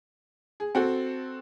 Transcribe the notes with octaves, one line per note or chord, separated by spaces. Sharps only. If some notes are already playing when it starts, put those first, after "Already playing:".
G#4
C4 F#4 A4